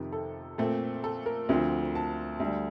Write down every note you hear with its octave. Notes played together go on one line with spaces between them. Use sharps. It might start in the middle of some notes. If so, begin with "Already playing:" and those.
Already playing: F2 C3 D#3
A4
A#2 A3 C4
A4
A#4
D2 D3 F3 C4
A5
D2 D3 G3